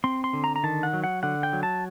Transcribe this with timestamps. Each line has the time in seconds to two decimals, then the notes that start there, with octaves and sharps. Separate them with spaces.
0.04 C4 C6
0.24 C6
0.33 D3
0.44 A#5
0.56 A#5
0.64 D#3 A5
0.83 F#5
0.93 F#3
1.04 F#5
1.23 D3 F#5
1.43 G5
1.53 F#3
1.63 A5